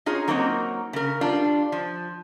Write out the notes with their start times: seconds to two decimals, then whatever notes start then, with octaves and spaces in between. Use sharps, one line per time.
0.06 D#4 F4 G#4 C#5
0.28 F#3 A#3 C4 C#4 D#4
0.93 C#3 A#4
1.21 G3 D4 F4
1.72 F3